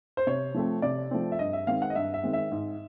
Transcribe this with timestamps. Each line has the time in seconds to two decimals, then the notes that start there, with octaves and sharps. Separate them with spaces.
0.17 C5
0.27 C3 C#5
0.54 F3 A3 C4
0.82 C3 D5
1.11 F3 A3 C4
1.32 E5
1.39 G2 D#5
1.53 E5
1.67 D#3 G#3 C4 F5
1.82 F#5
1.90 D#5
1.95 G2 E5
2.14 E5
2.23 D#3 G#3 C4
2.33 E5
2.52 G#2